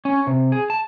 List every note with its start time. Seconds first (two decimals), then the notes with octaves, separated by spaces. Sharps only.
0.05 C#4
0.27 C3
0.52 G#4
0.70 A5